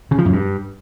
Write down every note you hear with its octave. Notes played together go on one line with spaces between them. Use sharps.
C#3
F3
F#2
G2